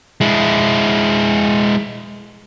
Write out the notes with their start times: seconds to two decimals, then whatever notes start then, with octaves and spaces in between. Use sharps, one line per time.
0.21 G#3 E4